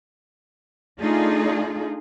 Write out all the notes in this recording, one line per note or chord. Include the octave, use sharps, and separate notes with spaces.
A3 D4 D#4 F4 G#4